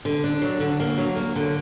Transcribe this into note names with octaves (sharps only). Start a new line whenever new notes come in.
D3
D4
F#3
D3
A#3
F#3
A#3
D3